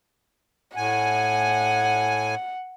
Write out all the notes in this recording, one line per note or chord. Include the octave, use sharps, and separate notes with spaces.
A2 F#5 G#5